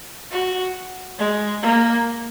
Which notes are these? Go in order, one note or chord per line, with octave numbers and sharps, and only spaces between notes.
F#4
G#3
A#3